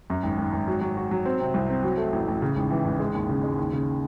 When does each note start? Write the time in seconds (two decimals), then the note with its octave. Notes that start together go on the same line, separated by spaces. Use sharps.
0.10 F#2
0.23 G#1
0.38 G#1
0.53 G#1
0.68 F#3
0.81 F#3
0.97 F#4
1.11 F#3
1.25 C4
1.41 C3
1.54 C2
1.70 C4
1.83 F#3
1.98 A3
2.12 A1
2.28 A1
2.42 C#3
2.56 G#1
2.71 E3
2.85 G#1
2.99 G#3
3.15 D#2
3.29 C#3
3.44 G#3
3.58 D#2
3.73 C#3